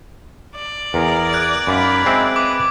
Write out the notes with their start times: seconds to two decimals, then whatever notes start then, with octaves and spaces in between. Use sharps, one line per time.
0.56 D5
0.94 E2 G#4 A#4
1.33 F#6 G#6 D7
1.67 F#2 D#4 F5 B5
2.06 G#3 C4 E5
2.36 B4 D6